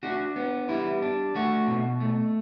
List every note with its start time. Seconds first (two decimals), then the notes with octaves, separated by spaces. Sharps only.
0.03 D4 F#4
0.36 B3
0.69 G3 E4
1.02 D4
1.35 A3 F#4
1.68 B2
2.00 A3